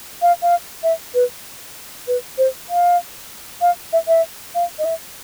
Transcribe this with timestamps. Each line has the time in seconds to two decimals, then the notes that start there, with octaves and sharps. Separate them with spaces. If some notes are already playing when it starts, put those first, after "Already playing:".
0.22 F5
0.42 F5
0.83 E5
1.14 B4
2.07 B4
2.38 C5
2.69 F5
3.61 F5
3.93 E5
4.08 E5
4.55 F5
4.79 D#5
4.85 E5